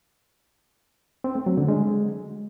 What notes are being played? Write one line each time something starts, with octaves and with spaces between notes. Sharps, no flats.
C4
A3
F#3
D3
G#3